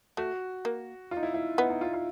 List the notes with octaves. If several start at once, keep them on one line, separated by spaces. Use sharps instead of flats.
A3 F#4
A#3
F4
D#4
E4
E4
B3 D#4
D#4
F4
F4